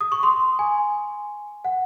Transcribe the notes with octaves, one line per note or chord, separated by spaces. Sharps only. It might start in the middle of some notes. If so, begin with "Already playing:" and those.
D#6
C#6
C6
G#5
F#5